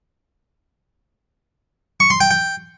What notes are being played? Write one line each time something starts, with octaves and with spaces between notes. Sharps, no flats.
C#6
C6
G5
G5